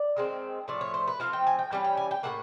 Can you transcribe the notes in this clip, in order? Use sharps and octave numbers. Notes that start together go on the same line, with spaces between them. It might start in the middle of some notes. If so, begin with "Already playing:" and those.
Already playing: D5
D#3 G#3 C4
A2 F3 A3 D5
C#5
C5
B4
F3 A3 C4 F5
G5
G#5
G5
E3 G3 C#4 G5
G5
G#5
G5
A2 F#3 A#3 F#5